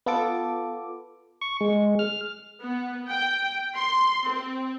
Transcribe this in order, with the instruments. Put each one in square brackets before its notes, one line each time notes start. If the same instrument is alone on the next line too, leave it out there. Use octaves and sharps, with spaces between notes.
[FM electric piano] B3 F4 A4 D6
[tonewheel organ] C#6
G#3
F6
[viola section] B3
G5
C6
C4